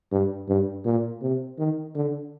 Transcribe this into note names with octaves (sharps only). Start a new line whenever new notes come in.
G2
G2
A#2
C3
D#3
D3